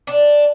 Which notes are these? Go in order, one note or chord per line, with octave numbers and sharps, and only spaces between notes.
D4